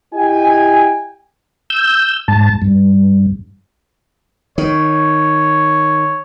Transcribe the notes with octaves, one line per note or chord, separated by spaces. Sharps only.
E4 G4 D#5 G5 G#5
E6 G6
G#2 A5
G2
D#3 C#5